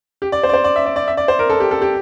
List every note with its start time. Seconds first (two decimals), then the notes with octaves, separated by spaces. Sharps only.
0.22 G4
0.32 D5
0.43 C5
0.49 D5
0.54 C5
0.64 D5
0.76 E5
0.86 D5
0.96 D5
1.08 E5
1.17 D5
1.28 C5
1.39 A#4
1.50 A4
1.60 G4
1.71 A4
1.82 G4